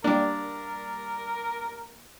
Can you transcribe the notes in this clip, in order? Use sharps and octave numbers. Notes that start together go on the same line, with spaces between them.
G3 A#3 D4 A#4